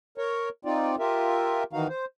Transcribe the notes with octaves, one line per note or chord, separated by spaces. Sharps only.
A#4 C#5
C4 D#4 F4 D5
F4 G4 A#4 E5
D#3 E3 D#4 F#4 F5
C5